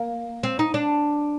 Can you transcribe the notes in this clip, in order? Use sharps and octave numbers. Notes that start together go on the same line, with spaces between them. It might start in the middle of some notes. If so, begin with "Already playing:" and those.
Already playing: A#3
C4
D#4
D4